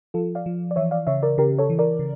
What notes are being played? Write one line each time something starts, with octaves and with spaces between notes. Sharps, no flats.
F3 F4 A4
D5 F5
F3
D5
E3 C#5 E5
D5 F5
C#3 C#5 E5
A#4 D5
C#3 G4 A#4
A4 C#5
E3
A#4 D5
C#3